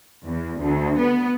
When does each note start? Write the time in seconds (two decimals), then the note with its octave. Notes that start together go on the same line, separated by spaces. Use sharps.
0.24 E2
0.61 D2
0.99 B3